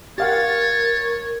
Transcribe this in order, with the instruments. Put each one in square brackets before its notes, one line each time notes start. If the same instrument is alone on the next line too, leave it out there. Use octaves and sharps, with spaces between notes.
[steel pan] G4 F5 F#5 [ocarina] A#4 [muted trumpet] C#5 [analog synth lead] A6